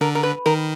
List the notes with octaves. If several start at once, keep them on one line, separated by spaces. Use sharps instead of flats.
D3 A#4
A#4
B4
D#3 A#4